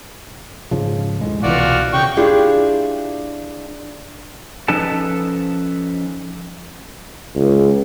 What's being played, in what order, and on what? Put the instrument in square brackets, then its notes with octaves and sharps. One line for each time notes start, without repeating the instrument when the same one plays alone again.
[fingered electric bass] G#2 C#3 F3
D2 A2 G#3
[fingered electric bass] C2 B2 E3 [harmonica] F4 F#4 D5
[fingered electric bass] C#3 [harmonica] G5 C#6
[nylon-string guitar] D4 E4 F4 G4 G#4
[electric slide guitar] F3 C#4 D#4 A4 B4 A5
[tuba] C#2